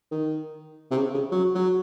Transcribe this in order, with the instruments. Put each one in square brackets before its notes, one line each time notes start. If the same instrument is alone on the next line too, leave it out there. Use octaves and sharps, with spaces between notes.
[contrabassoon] D#3
C3
C#3
C#3
F#3
F#3